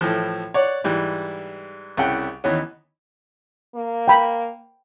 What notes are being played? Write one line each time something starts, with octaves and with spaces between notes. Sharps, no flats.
A2 E3 F3
C#5 D5 F#5
G#2 E3 G3
C2 C#3 E4 F#5 G5
D#2 E3 B3 C#4
A#3
G5 B5